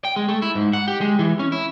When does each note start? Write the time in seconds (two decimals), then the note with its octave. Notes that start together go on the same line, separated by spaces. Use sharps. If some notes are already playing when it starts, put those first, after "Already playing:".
0.05 G5
0.16 G#3
0.29 A3
0.42 E4
0.55 G#2
0.73 F#5
0.88 G4
1.01 G#3
1.19 E3
1.39 C#4
1.52 E4